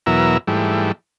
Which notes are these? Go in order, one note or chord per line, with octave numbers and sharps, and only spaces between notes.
E2 B2 F#3 A#4 E5
G#2 E3 G3 A3